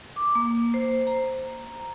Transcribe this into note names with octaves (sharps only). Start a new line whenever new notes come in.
D6
A#3
C5
A#5